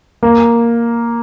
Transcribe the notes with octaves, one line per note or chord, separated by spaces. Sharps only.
A#3